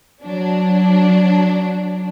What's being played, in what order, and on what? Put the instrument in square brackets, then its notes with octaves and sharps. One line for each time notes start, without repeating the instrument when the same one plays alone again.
[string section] F#3 D4